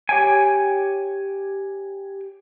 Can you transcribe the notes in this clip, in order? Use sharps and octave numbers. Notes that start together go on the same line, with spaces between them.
G4 C#5 G5 G#5